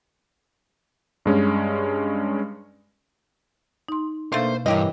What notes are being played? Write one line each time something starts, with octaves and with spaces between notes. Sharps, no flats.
G2 G#3 C#4
D#4 C6
B2 D3 A3 A#3 C5 F5
G2 E3 A#3 E4 G4 C#5 D#5